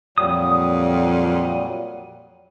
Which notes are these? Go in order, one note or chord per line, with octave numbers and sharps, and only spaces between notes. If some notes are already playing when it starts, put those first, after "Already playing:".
F2 A#2 F#3 G3 D#6